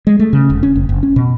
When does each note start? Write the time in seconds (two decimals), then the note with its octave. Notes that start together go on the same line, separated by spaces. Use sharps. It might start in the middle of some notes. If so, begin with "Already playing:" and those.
0.07 G#3
0.20 A3
0.33 C#3
0.50 E1
0.63 C#4
0.75 F#1
0.89 F#1
1.03 C#4
1.16 B2